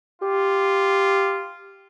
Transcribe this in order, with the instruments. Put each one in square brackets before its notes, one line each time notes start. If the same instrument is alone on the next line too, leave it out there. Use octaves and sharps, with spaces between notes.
[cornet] F4 [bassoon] G4